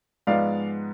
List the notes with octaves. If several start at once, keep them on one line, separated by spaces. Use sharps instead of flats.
G#2 F3 G#3 B3 D5 F5